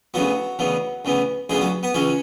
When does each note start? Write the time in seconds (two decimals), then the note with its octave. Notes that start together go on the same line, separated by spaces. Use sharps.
0.14 D2 C#3 E3 F#3 B3 F#4
0.59 D2 C#3 E3 B3
1.05 D2 C#3 E3 B3
1.50 D2 C#3 E3 G#3 B3 G#4
1.61 F#3 F#4
1.83 B3 B4
1.94 C#2 C#3 E3 C#4 C#5